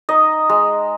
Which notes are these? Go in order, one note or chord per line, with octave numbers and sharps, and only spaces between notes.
D#4 D#5
G#3